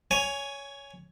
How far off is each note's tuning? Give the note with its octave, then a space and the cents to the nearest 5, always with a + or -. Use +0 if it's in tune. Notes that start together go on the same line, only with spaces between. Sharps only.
C#5 +15 G#5 +0